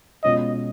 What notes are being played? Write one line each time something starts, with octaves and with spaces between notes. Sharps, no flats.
B2 G#3 C#4 F4 D#5